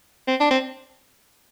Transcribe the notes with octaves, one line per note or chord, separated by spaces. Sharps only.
C4
D4
C4